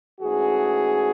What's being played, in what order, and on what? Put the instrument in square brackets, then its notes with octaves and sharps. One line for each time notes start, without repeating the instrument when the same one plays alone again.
[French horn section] G#2 E3 A3 C#4 F#4 G#4